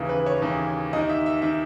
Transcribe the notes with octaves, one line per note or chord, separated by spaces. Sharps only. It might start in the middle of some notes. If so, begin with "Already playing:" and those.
Already playing: D#2 C#3 E3
B4
C#5
D#2 C#3 E3
D#2 D#3 D#5
E5
E5
D#3 E5